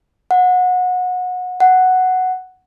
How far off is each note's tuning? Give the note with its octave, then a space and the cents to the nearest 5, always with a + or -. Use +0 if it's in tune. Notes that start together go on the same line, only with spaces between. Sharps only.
F#5 -25
F#5 +0